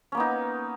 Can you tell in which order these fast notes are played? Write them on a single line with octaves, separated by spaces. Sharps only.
C#4 A#3 B3 D#4